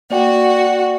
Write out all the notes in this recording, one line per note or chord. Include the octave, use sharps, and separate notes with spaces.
A#3 F#4 D5 G5